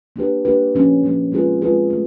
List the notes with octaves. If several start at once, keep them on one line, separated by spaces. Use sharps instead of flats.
A#3 D4 G4 B4
A#3 D4 G4 B4
A#2 F3 A#3 C#4
A#2 F3 A#3 C#4
G#3 C4 F4 G#4 B4
G#3 C4 F4 G#4 B4
A3